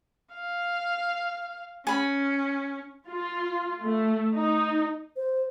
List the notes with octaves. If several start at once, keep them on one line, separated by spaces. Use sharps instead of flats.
F5
C#4 G#5 B5
F4
A3
D#4
C5